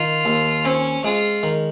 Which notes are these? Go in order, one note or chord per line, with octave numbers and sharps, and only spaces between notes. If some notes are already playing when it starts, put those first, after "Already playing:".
Already playing: D#3 F4
D#2
C4 C#4
G#3 F4
D#3